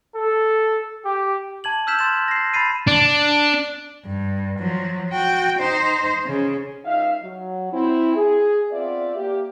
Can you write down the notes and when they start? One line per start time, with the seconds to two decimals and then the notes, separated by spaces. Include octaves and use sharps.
0.16 A4
1.05 G4
1.64 A5 G#6 F#7
1.87 E6 F6 G6 B6 E7
1.99 C6 A6 E7
2.28 A#6 C7
2.54 B5 A6 C7 D#7
2.88 D4
4.06 G2
4.59 F3 F#3
5.11 F#4 G5
5.59 D#4 C5
6.26 C#3
6.85 C#2 D#4 E5 F5
7.22 F#3
7.72 C4 E4
8.16 G#4
8.72 B3 C4 F4 D5 E5
9.16 A#3 G4